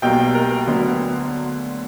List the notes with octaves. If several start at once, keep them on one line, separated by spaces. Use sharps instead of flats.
B1 B2 G3 A#3 G5
A#4
D2 D3 F#3 B3